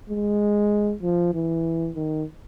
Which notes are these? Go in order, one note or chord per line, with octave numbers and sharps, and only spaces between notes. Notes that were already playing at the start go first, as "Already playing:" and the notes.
G#3
F3
E3
D#3